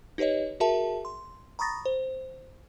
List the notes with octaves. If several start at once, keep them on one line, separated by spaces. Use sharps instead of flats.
D#4 G4 B4 C#5 D#5
F#4 G#4 A#4 E5 A5
C6
A#5 B5 C#6 D#6 A6 A#6
C5